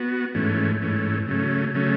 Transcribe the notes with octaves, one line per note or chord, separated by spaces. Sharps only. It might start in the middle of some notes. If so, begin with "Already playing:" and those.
Already playing: B3 F#4
G#2 E3 A3 C#4
G#2 E3 A3 C#4
C#3 F#3 A3 C#4
C#3 F#3 A3 C#4